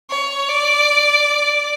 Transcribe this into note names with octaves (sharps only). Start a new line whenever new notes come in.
C#5
D5